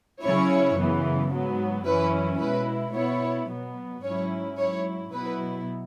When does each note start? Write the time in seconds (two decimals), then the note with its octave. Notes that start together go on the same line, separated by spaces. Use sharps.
0.21 C#3 F#3 C#4 E4 C#5
0.77 F#2 C#3 E3 B3
1.31 G#2 F#3 B3
1.85 F#2 E3 C#4 E4 B4
2.40 B2 G#3 E4 B4
2.94 B2 B3 E4 C#5
3.49 B2 F#3 B3
4.03 G#2 F#3 C#4 E4 C#5
4.58 G#2 F#3 E4 C#5
5.12 B2 F#3 B3 E4 B4